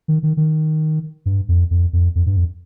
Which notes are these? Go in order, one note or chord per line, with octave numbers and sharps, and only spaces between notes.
D#3
D#3
D#3
G2
F2
F2
F2
F2
G2
F2